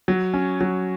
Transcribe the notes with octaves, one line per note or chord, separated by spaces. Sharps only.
F#3
C#4
F#3